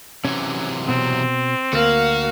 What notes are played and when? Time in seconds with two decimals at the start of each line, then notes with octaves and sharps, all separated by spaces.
0.25 C3 E3 F#3 C#4
0.88 B2 C4
1.73 D2 A#3 F#4 F5